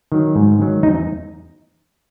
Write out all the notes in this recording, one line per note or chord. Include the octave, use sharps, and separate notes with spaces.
D#3 F#3
G#2
D#3 F#3
E2 D#4